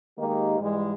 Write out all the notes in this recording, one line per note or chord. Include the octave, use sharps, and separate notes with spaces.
D#3 G#3 A#3 D#4 G4
G#2 E3 G3 G#3